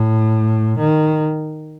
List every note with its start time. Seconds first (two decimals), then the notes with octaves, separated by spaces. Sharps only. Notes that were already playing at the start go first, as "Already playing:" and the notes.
Already playing: A2
0.78 D#3